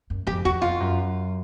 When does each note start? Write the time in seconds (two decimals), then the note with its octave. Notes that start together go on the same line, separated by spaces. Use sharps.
0.10 F#2
0.27 F2 G4
0.45 E2 F#4
0.62 F2 F4
0.80 F#2